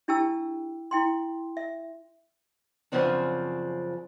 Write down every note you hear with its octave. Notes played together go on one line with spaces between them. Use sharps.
D4 E4 G4 G5 A5 E6
E4 G5 C6
E5
F#2 A2 C#3 F3 C4 D4